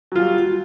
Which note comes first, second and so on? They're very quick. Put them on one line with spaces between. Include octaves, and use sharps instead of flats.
F#3 F4 G3